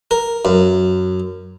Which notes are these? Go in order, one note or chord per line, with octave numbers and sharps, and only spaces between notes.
A#4
F#2